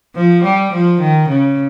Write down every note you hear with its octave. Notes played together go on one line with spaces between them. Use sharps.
F3
G3
F3
D#3
C#3